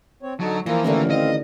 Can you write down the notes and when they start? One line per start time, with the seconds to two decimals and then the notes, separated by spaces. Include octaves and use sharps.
0.22 C4 C#5
0.40 D3 F#3 D#4 A5
0.66 E3 F3 A#3 F4 D#5
0.84 A1 D3 D#3 A3 A#3 A#4
1.10 C4 D#5 F5